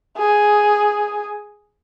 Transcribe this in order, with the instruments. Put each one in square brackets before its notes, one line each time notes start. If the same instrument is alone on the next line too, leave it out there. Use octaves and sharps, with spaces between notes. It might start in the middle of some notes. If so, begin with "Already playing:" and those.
[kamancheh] G#4